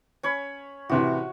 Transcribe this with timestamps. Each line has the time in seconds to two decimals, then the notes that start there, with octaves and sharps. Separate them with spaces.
0.23 C#4 C#5 B5
0.89 A2 C3 E3 F#4